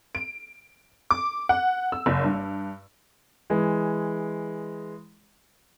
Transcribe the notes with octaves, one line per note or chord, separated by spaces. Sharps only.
D7
D6
F#5
E6
F#1
G2
E3 G#3